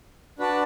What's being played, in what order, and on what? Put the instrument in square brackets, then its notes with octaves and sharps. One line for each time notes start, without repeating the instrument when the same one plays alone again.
[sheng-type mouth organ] D4 F#4 B4 D5 A5